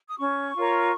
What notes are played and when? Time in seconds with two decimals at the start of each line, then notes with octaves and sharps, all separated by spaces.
0.09 D#6
0.18 C#4 C#6
0.55 F4 A#4 C#5